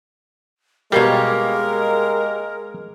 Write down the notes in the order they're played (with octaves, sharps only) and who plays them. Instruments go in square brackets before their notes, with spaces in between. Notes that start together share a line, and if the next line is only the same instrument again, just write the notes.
[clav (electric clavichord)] B2 G3 [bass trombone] G#3 [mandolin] A#3 G4 C#5 [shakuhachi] A#4